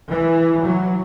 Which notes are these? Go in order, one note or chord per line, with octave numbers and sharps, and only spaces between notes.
E3
F#3